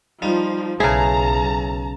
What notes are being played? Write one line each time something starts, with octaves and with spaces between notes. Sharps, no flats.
F3 G3 D#4 F4
B1 C#3 E4 G#4 A4 A5 A#5